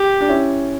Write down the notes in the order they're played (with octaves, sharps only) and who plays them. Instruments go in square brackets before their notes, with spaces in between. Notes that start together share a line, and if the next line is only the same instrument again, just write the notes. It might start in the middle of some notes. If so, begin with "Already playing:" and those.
Already playing: [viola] G4
[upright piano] D4
C#4 E4